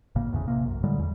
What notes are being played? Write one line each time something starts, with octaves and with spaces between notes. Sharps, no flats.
G#1 A2 C#3 A#3
G#1 E2 A2 C#3
A1 C3 A#3
B1 F#2
A2 D3 G3 G#3
E2 G3